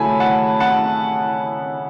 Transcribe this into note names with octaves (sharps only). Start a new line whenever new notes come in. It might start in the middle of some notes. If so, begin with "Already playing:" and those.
Already playing: C#3 F#3 A3 E4 G#5 A5 B5
F#5 A5
F#5 A5